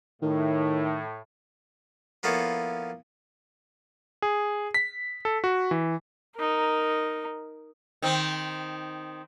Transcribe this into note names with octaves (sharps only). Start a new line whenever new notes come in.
A2 D#3
F3 A#3 B3 E4 A4 C#5
G#4
B6
A4
F#4
E3
D#4 A#4
D#3 C4